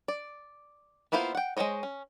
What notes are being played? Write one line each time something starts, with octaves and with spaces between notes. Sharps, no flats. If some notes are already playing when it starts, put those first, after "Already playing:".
D5
A#3 B3 E4 F4 C5
F#5 G5
G#3 A4 C5 C#5 D#5
C#4